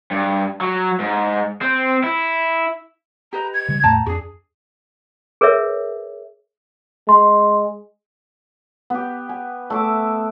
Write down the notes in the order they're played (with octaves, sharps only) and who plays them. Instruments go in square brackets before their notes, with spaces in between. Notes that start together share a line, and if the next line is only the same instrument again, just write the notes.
[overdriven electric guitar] G2
F#3
G#2
C4
E4
[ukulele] G4 B4 D#5 [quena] A#5
[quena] G#6
[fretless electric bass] C#3 G3
[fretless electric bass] E2 A2 A3 [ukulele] G5 A5 A#5
[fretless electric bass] F2 [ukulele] D4 F#4 [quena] G#4
[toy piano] G#4 A#4 B4 C#5 E5
[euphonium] G#3 [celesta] C6
[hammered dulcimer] B3 G4
G#5
A3 E5 D6